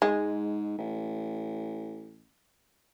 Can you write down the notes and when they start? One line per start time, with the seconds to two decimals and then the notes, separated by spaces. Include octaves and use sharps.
0.02 G#2 G#3
0.78 A1